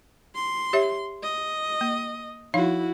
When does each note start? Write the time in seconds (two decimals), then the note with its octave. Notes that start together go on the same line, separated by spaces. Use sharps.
0.36 C6
0.73 G4 C#5 E5
1.23 D#5
1.81 A#3
2.54 F3 D#4 E4 F#4 F5